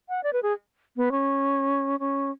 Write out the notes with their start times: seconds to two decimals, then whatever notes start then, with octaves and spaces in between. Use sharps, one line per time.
0.09 F#5
0.23 D5
0.33 B4
0.43 G#4
0.97 B3
1.11 C#4
2.00 C#4